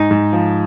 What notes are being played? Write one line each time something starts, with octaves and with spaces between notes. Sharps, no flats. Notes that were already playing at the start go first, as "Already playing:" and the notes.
Already playing: G#2 D#4
G#2
F3